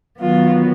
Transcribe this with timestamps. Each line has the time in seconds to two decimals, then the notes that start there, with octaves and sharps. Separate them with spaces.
0.20 D#3 F#3 B3 F4